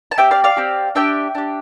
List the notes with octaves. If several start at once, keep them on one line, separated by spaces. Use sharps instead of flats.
A5
C4 G4 E5 G5
D5 F5
D5 F5
C4 G4
D4 G4 E5 G5
D4 G4